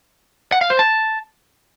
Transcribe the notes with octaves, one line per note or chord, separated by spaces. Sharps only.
F#5
F5
C5
A5